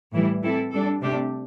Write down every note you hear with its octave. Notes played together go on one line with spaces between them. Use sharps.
A2 E3 G3 E4
E3 C4 E4 A4
G3 D4 A4
C3 A3 D4 G4